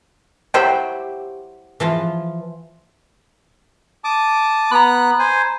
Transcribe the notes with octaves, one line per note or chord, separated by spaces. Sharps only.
F#3 E4 G4 C5 E5 G5
E3 F3 F4
A5 D6 D#6
B3 A#5 B5 F#6
C5 G#5